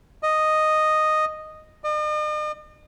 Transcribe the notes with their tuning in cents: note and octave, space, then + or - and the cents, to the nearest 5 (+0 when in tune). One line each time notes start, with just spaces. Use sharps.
D#5 -5
D#5 -45